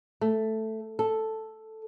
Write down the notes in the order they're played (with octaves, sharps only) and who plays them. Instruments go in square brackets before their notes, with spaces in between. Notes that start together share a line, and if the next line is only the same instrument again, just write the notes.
[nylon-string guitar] A3
A4